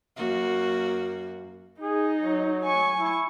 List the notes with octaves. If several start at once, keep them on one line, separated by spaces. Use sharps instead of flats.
F#2 A#3 F#4
D#4 G#4
F#3
G#5 C#6
E4